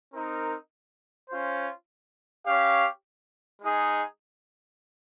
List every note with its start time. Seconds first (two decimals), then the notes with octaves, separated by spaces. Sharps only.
0.14 C4 D#4 A#4
1.30 C#4 F4 C5
2.46 C#4 G4 C#5 F5
3.62 G#3 D#4 G#4